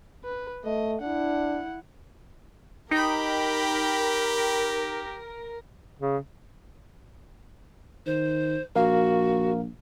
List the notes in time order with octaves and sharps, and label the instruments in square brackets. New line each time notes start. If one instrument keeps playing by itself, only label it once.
[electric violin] B4
[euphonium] A3 [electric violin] D#5
[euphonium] D4 [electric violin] E4 F#5
[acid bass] D#4 [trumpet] G4 [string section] A#4 [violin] G5 B5
[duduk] C#3
[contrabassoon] D#3 [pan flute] C5
[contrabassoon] A#1 [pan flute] F#4 [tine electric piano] A#4 F5